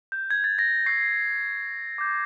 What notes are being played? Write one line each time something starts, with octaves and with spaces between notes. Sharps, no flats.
G6
G#6
A6
A#6
C#6 E6 G6 C7
D6 G6